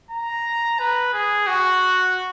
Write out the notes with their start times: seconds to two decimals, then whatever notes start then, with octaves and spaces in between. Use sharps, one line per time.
0.11 A#5
0.79 B4
1.14 G#4
1.47 F#4